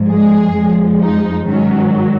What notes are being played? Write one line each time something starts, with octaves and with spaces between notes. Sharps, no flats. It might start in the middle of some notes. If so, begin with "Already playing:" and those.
Already playing: G#2 F3
G#3 G#4
F2 F3 G#3
D#4
G#2 D#3 F#3 C#4